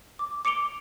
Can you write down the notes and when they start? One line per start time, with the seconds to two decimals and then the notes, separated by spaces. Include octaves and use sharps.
0.19 D6
0.45 D6 C#7 D7 F7 G7